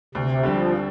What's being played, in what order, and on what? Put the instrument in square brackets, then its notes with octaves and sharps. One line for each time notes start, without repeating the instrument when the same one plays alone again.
[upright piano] D2 [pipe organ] C3
[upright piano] D3 G3 C4 [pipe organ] F3